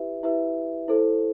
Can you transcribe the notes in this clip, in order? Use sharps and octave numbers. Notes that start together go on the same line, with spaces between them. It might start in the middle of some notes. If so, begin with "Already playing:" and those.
Already playing: E4 G4 B4 E5
E4 G4 B4 E5
E4 A4 C5